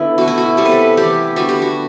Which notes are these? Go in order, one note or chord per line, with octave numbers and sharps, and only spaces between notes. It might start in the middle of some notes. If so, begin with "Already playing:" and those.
Already playing: D3 B3 E4
B2 A3 F#4
E4
F#4
C3 G3 B3 A4
B4
A4
E3 A3 G4
D3 G3 B3 F#4
G4
F#4